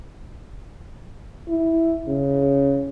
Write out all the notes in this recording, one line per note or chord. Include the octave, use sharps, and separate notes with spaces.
E4
C#3